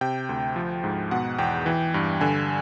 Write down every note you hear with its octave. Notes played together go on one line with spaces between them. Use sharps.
C3 G5
D2
F3
G#2
B2 F#5
E2 G5
E3
G2
D3 G#5